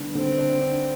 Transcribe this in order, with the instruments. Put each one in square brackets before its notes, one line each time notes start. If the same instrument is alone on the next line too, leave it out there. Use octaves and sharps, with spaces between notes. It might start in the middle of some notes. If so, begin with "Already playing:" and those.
Already playing: [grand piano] D3 G3 B3 D4
[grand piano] D3 [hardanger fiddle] C4
[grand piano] D4
D4